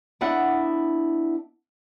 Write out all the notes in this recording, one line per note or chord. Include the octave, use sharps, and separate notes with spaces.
B3 D4 E4 D#5 F#5